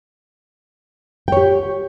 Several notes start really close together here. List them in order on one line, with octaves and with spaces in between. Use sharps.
G5 C#5 G4